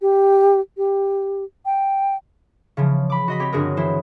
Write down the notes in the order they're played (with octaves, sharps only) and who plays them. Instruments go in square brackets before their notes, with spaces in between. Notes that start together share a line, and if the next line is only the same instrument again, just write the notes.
[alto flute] G4
G4
G5
[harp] C#3 E3 F3
B5 D6
F#4 D#5 B5
C4 G4 C#5
G1 G2 F#4 G#4 A#4
E3 E4 C5